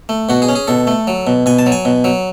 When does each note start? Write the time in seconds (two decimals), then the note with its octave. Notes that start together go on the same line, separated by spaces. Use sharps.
0.09 A3
0.29 B2 F#4
0.42 G#4
0.49 C#4
0.55 G#4
0.68 B2 A4
0.87 A3
1.07 F#3
1.27 B2
1.46 B2 G#5
1.59 A5
1.66 F#3
1.72 G#5
1.85 B2
2.04 F#3